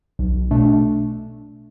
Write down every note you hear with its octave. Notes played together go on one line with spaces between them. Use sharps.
B1
B2 A3 D4